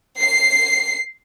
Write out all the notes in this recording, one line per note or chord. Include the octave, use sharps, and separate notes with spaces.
C7